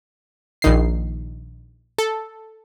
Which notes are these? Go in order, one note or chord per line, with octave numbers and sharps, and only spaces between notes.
A#1 D#3 C7
A4